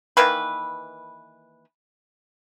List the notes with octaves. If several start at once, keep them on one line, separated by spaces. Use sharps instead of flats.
D#3 E3 A#3 B4